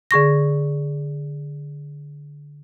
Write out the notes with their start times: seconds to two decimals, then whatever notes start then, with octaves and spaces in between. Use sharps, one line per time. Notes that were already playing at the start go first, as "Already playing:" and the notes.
0.11 D3 G#4 C#6 A#6